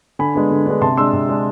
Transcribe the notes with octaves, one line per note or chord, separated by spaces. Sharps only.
D3 G#5 B5
G#3 B3 D4
D3
G#3 B3 D4
C3 A5 C6
G#3 D4 C6 E6
C3
G#3 D4